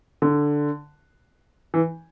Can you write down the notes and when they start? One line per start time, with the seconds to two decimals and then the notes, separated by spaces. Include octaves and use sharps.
0.22 D3
1.74 E3